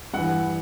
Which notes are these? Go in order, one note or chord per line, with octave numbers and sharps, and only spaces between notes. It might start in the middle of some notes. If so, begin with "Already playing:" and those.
G2 E3 F#5